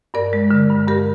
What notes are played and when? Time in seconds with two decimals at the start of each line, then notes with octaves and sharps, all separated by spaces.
0.14 G2 A#4 D5
0.33 G#3
0.51 D3
0.70 G2
0.88 G2 G4 A#4